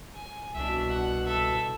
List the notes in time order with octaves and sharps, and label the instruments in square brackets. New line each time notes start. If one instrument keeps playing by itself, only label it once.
[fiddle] G#5
[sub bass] C2 [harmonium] B2 [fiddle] D4 E5
[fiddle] F#5
A4 E5